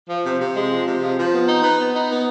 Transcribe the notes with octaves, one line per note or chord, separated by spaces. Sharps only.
F3
C3
C3
G#3
F3
C3
F3
F3
B3
D#4
B4
B3
D#4
B3